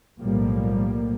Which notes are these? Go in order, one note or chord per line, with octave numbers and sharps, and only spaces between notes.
B1 A2 F3 G3 A#3